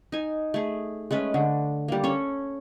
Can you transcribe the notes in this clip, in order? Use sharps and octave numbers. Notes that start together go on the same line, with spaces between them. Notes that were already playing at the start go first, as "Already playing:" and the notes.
D#4 G#5
A3 G#4
G#3 A3 C#4 B4
D3
G3 A#3
C#4 A4 C#5